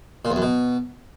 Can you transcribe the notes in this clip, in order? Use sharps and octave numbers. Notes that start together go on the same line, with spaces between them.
A#2
E2
F#2
B2